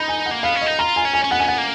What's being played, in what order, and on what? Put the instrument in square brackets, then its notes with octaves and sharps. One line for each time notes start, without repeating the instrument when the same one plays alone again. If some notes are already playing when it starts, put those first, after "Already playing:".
Already playing: [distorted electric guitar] D#4 [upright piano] B5
[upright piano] G#5
F#5
[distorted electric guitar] A#3
[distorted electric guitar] B3 [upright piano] F5
[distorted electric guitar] C#4
[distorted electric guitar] D#4 [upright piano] D#5
[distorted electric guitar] F4 [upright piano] A#5
[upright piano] G#5
[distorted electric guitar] C#4
[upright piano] G#5
[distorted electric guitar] C#4
[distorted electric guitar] B3 [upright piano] F#5
[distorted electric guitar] C#4 [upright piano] G#5
[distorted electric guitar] B3 [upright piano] F#5
[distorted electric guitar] A#3